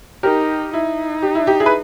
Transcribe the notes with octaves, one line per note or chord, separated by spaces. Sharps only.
D#4 G4 A#4
D#4 E4
G4
E4
G4
E4 G#4
B4